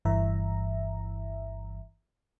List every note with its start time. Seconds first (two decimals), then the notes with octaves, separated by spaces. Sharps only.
0.05 G1 G2 E3 E5 A#5